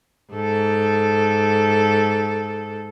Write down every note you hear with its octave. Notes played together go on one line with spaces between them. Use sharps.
G#2 A4